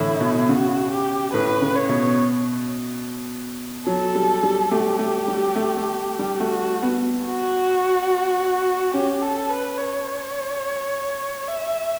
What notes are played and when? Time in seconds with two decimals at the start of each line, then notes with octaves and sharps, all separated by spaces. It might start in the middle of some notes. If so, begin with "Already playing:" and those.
Already playing: A2 D3 E3 E4
0.21 B2
0.49 C#3 F#4
0.91 G4
1.34 A2 B4
1.61 C#3
1.76 C#5
1.89 B2
3.87 F#3 A4
4.15 G3
4.43 G3
4.71 A3 G4
4.99 A3
5.28 G3
5.56 A3
5.77 A3
6.19 G3
6.40 A3 F#4
6.83 B3
7.25 F#4
8.94 C#4 G4
9.22 A4
9.50 B4
9.78 C#5
11.48 E5